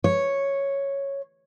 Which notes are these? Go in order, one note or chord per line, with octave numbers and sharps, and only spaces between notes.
C#5